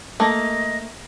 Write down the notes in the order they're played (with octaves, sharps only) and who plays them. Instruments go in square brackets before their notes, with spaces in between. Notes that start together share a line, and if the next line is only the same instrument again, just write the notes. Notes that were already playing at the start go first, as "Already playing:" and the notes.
[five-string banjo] A3 A#3 [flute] D#5